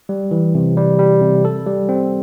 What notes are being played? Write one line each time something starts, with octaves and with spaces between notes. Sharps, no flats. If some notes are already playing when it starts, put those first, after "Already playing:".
G3
E3
C3
G3
G3
C3
A4
G3
C4